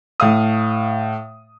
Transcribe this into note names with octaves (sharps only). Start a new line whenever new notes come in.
A2 F5 D#6